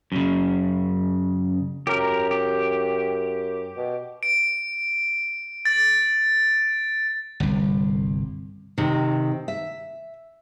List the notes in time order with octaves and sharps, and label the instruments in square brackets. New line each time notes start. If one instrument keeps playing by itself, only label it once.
[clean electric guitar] F#2 C#3
[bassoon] F#2 [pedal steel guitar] G4 A#4
[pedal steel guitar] G4
[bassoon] B2
[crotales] D7
A6
[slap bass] G1 C2
[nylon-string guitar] C3 D#3
E5